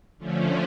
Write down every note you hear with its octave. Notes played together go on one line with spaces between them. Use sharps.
D3 F3 A3 C#4